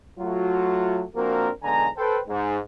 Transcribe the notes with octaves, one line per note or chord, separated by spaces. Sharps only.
F#3 A3 F4 F#4
F3 A#3 C4 D4 F#4 A#4
B1 D3 G#3 B3 G#5 A#5
A4 B4 C5 G5
G#2